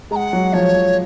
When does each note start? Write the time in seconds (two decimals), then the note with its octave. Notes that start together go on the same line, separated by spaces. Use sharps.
0.11 G#3 A#5
0.16 F#5
0.33 F#3
0.53 F3 C#5
0.73 F3